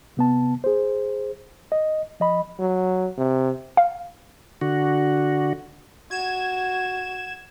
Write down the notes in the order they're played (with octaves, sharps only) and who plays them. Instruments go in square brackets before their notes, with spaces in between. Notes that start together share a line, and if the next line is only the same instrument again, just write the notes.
[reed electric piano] C3 B3 A5
G#4 C5
D#5
F3 D#5 B5
[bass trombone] F#3
C3
[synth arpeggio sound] F5
[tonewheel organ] D3 F#4
[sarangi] F#4 [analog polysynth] G#6 E7